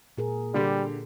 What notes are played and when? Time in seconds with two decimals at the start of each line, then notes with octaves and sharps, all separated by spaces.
0.18 A#2 G#4 A#4
0.54 D3 G3 G4